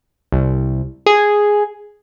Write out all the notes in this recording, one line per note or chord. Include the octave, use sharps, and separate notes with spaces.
C2
G#4